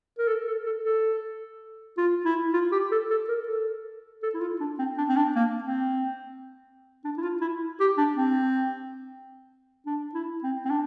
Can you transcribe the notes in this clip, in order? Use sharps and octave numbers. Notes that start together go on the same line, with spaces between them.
A#4
A4
A4
A4
A4
F4
E4
F4
G4
A4
A4
A#4
A4
A4
E4
F4
D4
C4
D4
C4
D4
A#3
C4
D4
E4
F4
E4
G4
D4
C4
D4
E4
C4
C4
D4